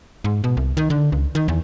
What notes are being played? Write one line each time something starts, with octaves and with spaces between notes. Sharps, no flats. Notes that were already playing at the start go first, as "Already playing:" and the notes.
G#2
B2
C2
D#3
D3
C#2
D#3
E2